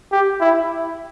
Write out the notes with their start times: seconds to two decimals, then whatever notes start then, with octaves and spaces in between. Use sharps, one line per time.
0.12 G4
0.41 E4